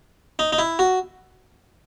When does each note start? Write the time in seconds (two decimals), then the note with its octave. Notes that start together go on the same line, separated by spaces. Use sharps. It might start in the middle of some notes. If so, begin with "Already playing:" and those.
0.39 D#4
0.53 D#4
0.59 E4
0.79 F#4